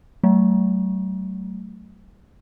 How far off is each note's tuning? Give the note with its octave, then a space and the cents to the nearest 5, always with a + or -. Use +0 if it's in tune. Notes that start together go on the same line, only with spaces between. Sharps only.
F#3 +35 A3 +0